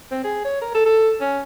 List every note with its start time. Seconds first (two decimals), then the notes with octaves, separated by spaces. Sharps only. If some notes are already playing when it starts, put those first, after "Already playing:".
0.11 C4
0.24 G#4
0.44 C#5
0.61 A#4
0.74 A4
0.86 A4
1.21 C#4